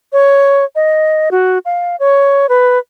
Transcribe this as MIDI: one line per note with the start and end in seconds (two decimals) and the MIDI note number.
0.13 0.64 73
0.75 1.29 75
1.31 1.58 66
1.65 1.96 77
2.00 2.47 73
2.49 2.78 71